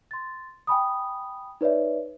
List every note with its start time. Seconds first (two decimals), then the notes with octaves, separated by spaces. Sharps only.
0.11 C6 A6
0.67 G5 G#5 B5 D#6
1.61 D#4 B4 C#5 D5 E5